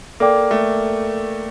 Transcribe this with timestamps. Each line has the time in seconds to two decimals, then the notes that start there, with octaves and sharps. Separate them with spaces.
0.20 A#3 A4 D5 G5 D6
0.51 A3